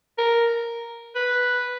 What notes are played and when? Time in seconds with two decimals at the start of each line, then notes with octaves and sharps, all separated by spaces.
0.18 A#4
1.15 B4